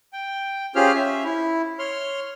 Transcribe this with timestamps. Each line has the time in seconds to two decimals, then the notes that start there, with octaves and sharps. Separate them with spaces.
0.13 G5
0.75 C#4 F4 G4 G#4 C5 F6
0.95 C#4 E5
1.24 E4
1.79 C#5 C6 F6